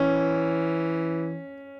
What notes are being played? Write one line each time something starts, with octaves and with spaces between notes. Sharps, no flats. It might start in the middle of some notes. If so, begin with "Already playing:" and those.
Already playing: E3 C#4